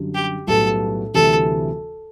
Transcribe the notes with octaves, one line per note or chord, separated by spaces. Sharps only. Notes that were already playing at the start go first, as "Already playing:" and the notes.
Already playing: F#2 D3 G3
G4
B1 A2 G3 B3 F#4 A4
D2 C3 E3 G3 A4